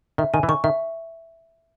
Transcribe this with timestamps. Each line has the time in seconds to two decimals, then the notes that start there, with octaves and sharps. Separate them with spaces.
0.18 D#3 E5
0.34 D#3 G#5
0.43 E3
0.49 D#3 C#6
0.64 D#3 E5